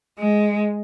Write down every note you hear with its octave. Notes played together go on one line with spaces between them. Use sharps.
G#3